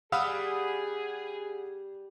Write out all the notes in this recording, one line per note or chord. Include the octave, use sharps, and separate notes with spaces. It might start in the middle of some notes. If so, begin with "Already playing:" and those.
G3 G#4 F5 F#5 B5 D#6 E6